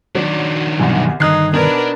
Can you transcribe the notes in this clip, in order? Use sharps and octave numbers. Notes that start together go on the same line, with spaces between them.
D#3 F#3 D4
C2 G2 B2 E3 F#3
G2 D3 D#3 D#4 F#6 G#6 C7
B2 D4 A#4 B4 G#6